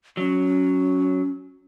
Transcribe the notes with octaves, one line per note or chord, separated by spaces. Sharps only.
F#3 C#4